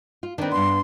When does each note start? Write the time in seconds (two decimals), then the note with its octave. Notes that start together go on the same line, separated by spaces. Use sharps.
0.23 F4
0.38 D#3 C4 D4 B4
0.52 G2 B3 C6